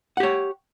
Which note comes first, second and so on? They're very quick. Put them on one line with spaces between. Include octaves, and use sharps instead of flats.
F#5 G4 C#5